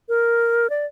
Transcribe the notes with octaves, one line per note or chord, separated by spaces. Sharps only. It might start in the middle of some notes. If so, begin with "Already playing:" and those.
A#4
D5